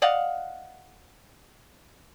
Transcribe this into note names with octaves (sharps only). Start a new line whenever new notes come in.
D5 D#5 F5 F#5